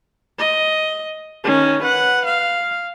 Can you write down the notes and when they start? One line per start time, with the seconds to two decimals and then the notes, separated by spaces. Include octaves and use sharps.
0.39 D#5
1.44 D#3 C#4
1.83 B4 F#5
2.25 F5